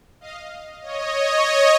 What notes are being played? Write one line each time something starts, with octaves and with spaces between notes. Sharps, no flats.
D#5 F5
C#5 D#5